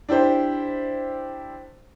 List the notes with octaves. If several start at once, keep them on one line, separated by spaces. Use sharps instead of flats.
D4 E4 G4 C5